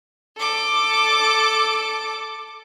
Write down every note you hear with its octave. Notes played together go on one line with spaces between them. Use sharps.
A4 D6